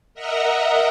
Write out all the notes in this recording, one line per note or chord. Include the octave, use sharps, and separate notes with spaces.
A#4 D#5 E5 F#5 A#5